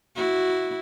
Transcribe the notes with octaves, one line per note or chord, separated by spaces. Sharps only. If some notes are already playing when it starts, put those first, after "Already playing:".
E4 F#4